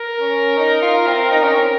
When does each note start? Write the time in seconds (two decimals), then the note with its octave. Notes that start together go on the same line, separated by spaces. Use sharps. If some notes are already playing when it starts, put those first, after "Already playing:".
Already playing: A#4
0.21 C#4
0.57 D#4
0.82 F4
1.07 C4
1.32 D#4
1.43 C#4
1.54 C4